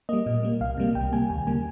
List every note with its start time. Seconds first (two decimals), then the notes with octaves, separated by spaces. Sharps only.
0.09 G3 A#3 D#5
0.26 A#2
0.43 G3 A#3
0.61 C2 F5
0.77 C3 G3 A#3
0.95 C2 G5
1.13 C3 G3 A#3 G#5
1.30 D#2 G#5
1.47 C#3 G3 A#3 G#5